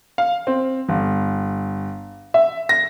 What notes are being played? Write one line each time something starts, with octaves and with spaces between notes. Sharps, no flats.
F5
C4
G1
E5
A#6